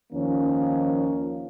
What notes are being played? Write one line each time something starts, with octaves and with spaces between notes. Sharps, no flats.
D#2 D#3 F3 A#3 C#4